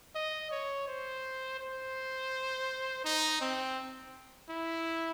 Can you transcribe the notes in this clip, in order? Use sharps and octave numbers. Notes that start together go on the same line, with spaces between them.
D#5
C#5
C5
C5
D#4
C4
E4